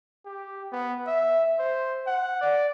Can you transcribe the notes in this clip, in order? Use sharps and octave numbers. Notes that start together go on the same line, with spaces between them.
G4
B3
E5
C5
F#5
D5